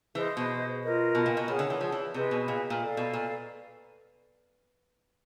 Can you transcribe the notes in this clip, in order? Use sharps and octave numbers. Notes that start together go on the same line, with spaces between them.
E3 G#4 C5 D#5
B2
F4 A#4 D#5
B2
A#2
B2
A#2 G#4 C#5 F#5
D3
E3
F3
E3
C3 G#4 B4 D#5
B2
A#2
A#2
A4 D5 F5
B2
A#2